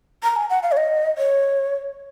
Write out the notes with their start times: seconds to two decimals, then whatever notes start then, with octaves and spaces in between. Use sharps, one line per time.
0.23 A#5
0.36 G#5
0.50 F#5
0.63 F5
0.72 C#5
0.77 D#5
1.18 C#5